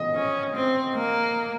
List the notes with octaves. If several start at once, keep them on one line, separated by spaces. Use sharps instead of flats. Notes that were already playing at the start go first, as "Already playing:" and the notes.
Already playing: D#5
C#4
C4
A#3